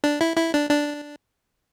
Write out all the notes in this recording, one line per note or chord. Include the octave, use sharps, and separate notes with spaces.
D4
E4
E4
D4
D4